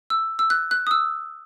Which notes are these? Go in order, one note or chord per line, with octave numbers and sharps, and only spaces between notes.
E6
E6
F#6
F#6
D#6
E6